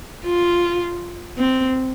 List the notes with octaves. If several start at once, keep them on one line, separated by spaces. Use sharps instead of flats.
F4
C4